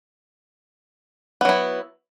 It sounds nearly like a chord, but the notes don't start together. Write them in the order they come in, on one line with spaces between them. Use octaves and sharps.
B3 F#3 E4